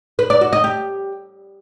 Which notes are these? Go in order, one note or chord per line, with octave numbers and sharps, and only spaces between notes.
B4
D5
F#4
D#5
G4